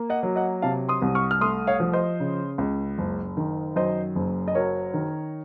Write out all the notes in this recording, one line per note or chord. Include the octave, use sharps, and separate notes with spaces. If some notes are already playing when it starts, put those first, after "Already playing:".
Already playing: A#3
D#5 F#5
F#3
D#5 F#5
C3 F5 A5
C6 D#6
C2
C#6 F6
F6
A3 C6 D#6
C#5 F5
F3
C5 D#5
C#3
C#2
F#1
D#3
F#2 C5 D#5
F#1
D#5
F#3 A#4 C#5
D#3